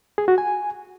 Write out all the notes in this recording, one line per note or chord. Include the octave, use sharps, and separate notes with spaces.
G#4
F#4
G#5